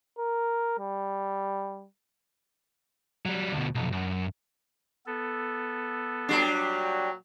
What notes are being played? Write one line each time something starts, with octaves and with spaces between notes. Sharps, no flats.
A#4
G3
F#3 G3
D2 B2
B1 F2
F#2
B3 A4
A#2 F#3 G3 D4